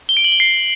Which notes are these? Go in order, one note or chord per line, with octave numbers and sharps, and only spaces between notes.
G7
D7
F#7
G7
C7